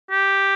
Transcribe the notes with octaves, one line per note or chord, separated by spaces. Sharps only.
G4